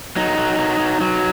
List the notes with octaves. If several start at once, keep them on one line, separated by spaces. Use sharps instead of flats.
F#3 D#4
F#3
F#3
F#3
F#3